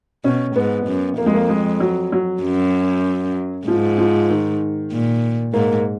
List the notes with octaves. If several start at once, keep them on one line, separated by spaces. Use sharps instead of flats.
B2 C#4
G#2 B3
F#2
F2 A#3
G#3
A#3
G#3
F#3
F#3
F#2
G#2 F3
F3
D#3
A#2
G#2 A#3